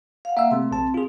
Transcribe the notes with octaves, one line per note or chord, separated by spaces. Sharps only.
F5 F#5
A#3 E5 F5 E6
C3 A3 C4
A#1 A5
F4 G#4